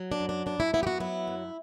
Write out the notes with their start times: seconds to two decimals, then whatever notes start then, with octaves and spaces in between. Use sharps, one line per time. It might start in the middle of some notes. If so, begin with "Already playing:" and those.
Already playing: F#3
0.12 D4
0.20 F#2
0.29 D4
0.46 F#2 D4
0.60 E4
0.74 B3 E4
0.83 G4
0.87 F#4
1.00 F#3 E4
1.28 F#2